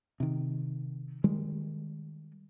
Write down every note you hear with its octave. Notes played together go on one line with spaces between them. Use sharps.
C3 D#3
D#3 G3 G#3